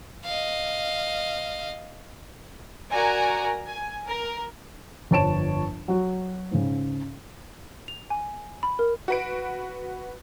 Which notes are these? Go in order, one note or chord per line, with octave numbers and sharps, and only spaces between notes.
D#5 F5
F#4 A#4 D5 G#5 A#5
G#5
A#4
G1 F2 C#5 A5 D7 E7
F#3 F#4
G#2 C#3
F7
G#5
B5
A#4
F#4 B4 D7